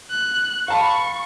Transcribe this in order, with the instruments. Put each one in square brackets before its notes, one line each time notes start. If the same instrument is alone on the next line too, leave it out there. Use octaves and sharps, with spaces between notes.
[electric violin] F#6
[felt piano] F5 A5 B5 [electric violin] C#6